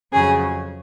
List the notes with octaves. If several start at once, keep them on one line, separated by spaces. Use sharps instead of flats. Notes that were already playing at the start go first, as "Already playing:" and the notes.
F2 C#3 F#3 G#4